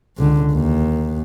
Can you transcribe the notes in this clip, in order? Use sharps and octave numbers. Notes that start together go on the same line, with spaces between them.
C#2 D3
D#2